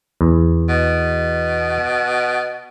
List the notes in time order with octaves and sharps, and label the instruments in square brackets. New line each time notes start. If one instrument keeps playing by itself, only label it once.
[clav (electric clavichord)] E2
[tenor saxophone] B2